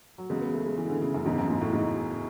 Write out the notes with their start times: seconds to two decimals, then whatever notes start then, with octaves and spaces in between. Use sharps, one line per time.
0.18 F#3
0.30 E2 C#3 F#3 G#3
0.41 B3
0.54 A3
0.66 G#3
0.78 E3
0.90 D3
1.02 C#3
1.14 F#2
1.25 E1 E2 G#2 C#3
1.38 F#2
1.50 G#2
1.61 A2
1.73 G#2